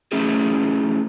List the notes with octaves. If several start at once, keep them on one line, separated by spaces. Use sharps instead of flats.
A3 C#4 E4 F#4 G#4